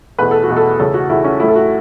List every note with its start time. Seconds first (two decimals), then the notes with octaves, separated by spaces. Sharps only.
0.18 E2 B2 A3 B4
0.31 A4
0.43 F#4
0.49 E2 B2 A3
0.56 A4
0.79 E2 C#3 A3 A4
0.94 F#4
1.09 E2 C#3 A3 E4
1.24 C#4
1.40 A2 A3 E4
1.48 A4
1.55 F#4